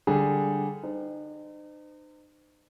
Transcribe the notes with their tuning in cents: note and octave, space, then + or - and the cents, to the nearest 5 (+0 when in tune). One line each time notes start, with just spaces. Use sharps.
D3 +0 G3 +0 G#4 +0
D#4 -40 C5 -35